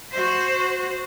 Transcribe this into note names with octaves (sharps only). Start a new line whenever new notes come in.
F#4 C5